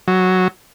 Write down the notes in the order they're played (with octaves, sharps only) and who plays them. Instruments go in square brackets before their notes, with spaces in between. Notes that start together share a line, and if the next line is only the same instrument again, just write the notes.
[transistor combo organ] F#3